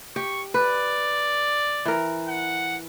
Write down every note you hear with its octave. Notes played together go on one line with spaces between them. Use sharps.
G4 C#6
B4 D5
E3 A#4
F#5